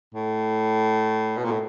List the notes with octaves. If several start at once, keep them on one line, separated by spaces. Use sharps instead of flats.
A2
B2
A#2
A2